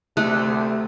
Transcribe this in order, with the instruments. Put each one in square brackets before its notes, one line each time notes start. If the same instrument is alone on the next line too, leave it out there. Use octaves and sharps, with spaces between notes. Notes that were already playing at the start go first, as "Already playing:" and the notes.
[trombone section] D2 C3 [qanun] A3 [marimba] F#6